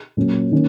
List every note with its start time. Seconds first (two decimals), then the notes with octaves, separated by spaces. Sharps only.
0.17 A#2 F#3 A#3 C#4
0.52 D#3 A#3 C#4